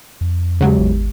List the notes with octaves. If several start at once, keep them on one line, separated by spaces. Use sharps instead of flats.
F2
E2 C#3 F#3 G#3 G4
G#1